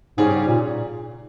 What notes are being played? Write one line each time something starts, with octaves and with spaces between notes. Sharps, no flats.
G#2 C#3 G3 C#4 G#4
G#2
A#2